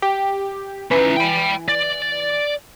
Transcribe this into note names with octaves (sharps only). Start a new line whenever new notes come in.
G4
E3 C#4 D#4
G5 B5
D5